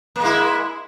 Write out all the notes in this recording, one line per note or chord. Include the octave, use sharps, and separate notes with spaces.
G#3 A#3 E4